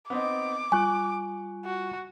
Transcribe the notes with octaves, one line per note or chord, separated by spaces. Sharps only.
B3 C4 D#4 D6
G3 F4 G#5 C#6 F#6
F#4